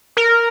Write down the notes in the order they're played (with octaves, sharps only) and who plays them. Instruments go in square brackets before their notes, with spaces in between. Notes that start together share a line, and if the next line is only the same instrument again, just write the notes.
[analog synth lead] A#4